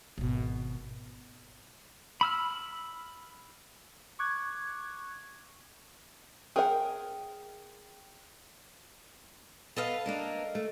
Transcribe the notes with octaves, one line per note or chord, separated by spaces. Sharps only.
G#1 B2
B5 E6 F6
C#6 D6 F#6 G#6
G#4 A#4 F#5 G5
B3 A4 B4 D#5 F5
A#3 D4 A#4
A3